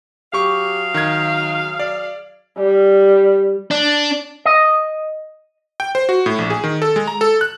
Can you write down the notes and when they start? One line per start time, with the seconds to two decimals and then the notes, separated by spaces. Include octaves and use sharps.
0.33 F#3 G4 G#4 F5 C#6
0.94 D#3 G#6
1.79 D5
2.58 G3
3.71 D4
4.45 D#5
5.80 G5
5.95 C5
6.09 F#4
6.26 A2
6.38 A#1
6.50 G#4
6.64 D#3
6.82 A4
6.96 G#3
7.07 A#5
7.21 A4
7.41 F#6